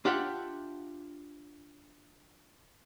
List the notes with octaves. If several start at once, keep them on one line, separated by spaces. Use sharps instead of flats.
D4 F4 G4 E5 F#5